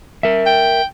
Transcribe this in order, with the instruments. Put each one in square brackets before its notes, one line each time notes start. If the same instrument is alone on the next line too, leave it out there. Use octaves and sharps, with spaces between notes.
[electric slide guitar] A#4 E5
[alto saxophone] G5